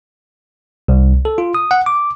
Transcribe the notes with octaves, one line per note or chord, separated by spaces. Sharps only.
C2
A4
F4
D#6
F#5
D6